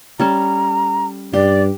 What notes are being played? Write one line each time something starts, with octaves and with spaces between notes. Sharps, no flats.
G3 C#4 A4 A#5
G2 G4 D5